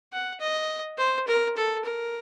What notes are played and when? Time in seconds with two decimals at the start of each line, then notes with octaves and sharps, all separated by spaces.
0.13 F#5
0.40 D#5
0.98 C5
1.27 A#4
1.57 A4
1.85 A#4